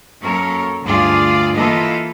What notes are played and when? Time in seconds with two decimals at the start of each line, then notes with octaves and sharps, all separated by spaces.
0.22 F#2 A#3 A4 A#4 C#5
0.84 D2 G2 F4 G#4 D5
1.56 E3 A#3 F4 A4 B4 D#5